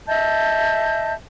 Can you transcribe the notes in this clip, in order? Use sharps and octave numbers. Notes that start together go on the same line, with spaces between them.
D#5 E5 A5 G6